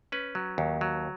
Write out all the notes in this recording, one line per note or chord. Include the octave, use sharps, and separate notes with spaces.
C#4 B4
F#3
D#2
F#3